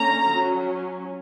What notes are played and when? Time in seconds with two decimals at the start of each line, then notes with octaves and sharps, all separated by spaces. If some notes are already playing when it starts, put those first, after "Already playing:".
Already playing: D3 A#3 C#4 A#5
0.29 F#3 C#4